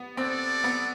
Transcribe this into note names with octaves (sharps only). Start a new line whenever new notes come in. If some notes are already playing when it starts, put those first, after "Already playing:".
Already playing: B3
C4 F#4 A4 D5
B3